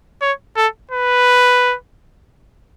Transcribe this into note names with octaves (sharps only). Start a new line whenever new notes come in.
C#5
A4
B4